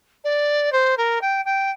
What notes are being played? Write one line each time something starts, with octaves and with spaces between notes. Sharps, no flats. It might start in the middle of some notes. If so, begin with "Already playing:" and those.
D5
C5
A#4
G5
G5